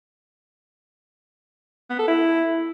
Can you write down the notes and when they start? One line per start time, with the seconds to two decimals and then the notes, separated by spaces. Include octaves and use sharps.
1.90 B3
1.99 A4
2.08 E4